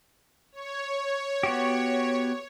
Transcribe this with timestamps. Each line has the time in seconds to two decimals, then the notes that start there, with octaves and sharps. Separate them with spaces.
0.52 C#5
1.43 B3 F#4 G4